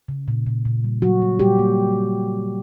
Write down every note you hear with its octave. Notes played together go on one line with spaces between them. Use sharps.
C#3
A#2
A#2
A#2
G3
F#3 G3 F#4
A#3
A#2 G3 G4
A#3